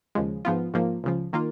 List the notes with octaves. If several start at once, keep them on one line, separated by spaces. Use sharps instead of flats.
D#2 C#3 F3 G#3
G#2 F3 B3 F4
G#2 F3 A#3
C#2 C#3 F3
D#3 A#3 F4